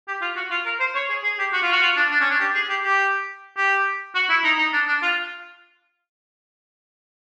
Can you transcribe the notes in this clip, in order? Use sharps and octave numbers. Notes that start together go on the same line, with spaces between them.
G4
F4
F#4
F4
A#4
C5
C#5
G#4
G#4
G4
F#4
F4
F#4
F4
D4
D4
C#4
D4
G4
G#4
G4
G4
G4
F#4
E4
D#4
D#4
D4
D4
F4